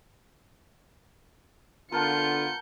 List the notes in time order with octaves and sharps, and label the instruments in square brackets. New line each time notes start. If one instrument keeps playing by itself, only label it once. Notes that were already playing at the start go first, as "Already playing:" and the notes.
[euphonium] D3 [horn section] B3 F4 [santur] A#4 F#5 A5 [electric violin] G6 C#7